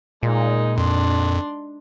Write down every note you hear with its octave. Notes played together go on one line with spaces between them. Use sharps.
A#2 G#3 D#4
F2 D4 C6